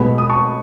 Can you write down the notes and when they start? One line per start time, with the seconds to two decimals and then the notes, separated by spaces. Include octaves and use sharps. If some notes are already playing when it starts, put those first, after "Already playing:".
Already playing: B1 B2 G#3 B3 B5
0.18 D#6
0.30 A5 C#6